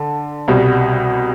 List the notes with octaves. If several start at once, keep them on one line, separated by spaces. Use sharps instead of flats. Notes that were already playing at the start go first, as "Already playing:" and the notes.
Already playing: D3 A4
C2 B2 G3